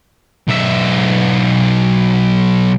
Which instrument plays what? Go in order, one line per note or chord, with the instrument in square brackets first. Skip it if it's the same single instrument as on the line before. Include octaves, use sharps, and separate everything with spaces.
[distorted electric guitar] B1 E5